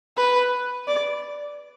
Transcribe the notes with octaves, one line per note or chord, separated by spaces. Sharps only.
B4
D5